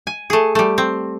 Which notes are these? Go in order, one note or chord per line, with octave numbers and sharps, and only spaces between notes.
G#5
A3 G#4
G3 A3
C4